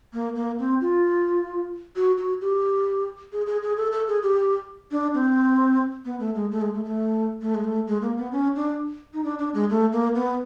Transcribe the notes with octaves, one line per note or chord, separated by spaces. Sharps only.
A#3
A#3
C4
F4
F#4
F#4
G4
G#4
G#4
G#4
A4
A4
G#4
G4
D4
C4
B3
A3
G#3
A3
G#3
A3
A3
A3
G#3
A3
G#3
A#3
B3
C#4
D4
D#4
D4
D4
G#3
A3
A#3
B3